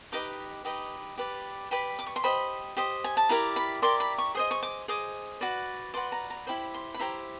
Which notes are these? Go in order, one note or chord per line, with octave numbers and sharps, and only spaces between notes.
D#4 G4 B4 D#5 D6
D#4 G4 B4 D#5
G4 B4 D5
G4 B4 D5
D6
C#6
C6
G4 C5 D#5 B5
G4 C5 D#5
G#5
A5
E4 G4 A#4 D5 A#5
B5
E4 G4 A#4 D5 C6
B5
C#6
G#4 C5 D#5 D#6
C#6
D6
G#4 C5 D#5 D6
F#4 B4 D5
F#4 B4 D5 C6
A#5
A#5
E4 G4 C5 B5
C6
B5
E4 G4 C5 A#5